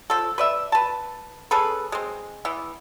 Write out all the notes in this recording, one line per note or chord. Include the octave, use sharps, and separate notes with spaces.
F3 A4
B4 D5 E5
B4 A5
C#4 G#4 A4 B4
G#3 C4
E3 B3